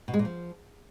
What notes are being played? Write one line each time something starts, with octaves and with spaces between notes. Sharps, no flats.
B2
G#3
A#2
F3